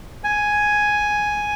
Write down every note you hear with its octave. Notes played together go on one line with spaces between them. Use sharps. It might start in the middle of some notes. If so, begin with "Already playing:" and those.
G#5